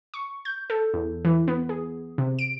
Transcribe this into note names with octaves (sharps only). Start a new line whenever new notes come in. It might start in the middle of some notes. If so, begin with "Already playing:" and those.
C#6
G6
A4
E2
E3
B3
G#4
C3
D7